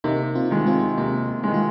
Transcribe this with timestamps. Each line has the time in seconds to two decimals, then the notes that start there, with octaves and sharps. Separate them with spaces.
0.04 C3 A#3 D#4
0.35 C4 F4
0.50 D#3 G#3
0.67 C4 F4
0.98 C3 A#3 D#4
1.43 D#3 G#3 D#4
1.54 F4